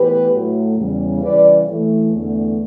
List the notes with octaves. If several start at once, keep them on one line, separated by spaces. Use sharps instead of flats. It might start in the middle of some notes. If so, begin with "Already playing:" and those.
Already playing: A2 E3 B3 G4 B4
A2 F#3 A3
E2 C#3 G3
C#3 E3 G3 B4 D5
A2 E3 A3
E2 D3 A3